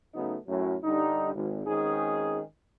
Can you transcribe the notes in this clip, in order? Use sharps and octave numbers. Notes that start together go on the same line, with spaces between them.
C#3 F#3 A3 B3 D#4
F#2 A2 F#3
G2 D3 G3 D#4
G#1
G#1 G#2 D#3 C#4 D#4 G#4